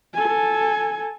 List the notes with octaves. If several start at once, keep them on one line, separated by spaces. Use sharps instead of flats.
A4 G#5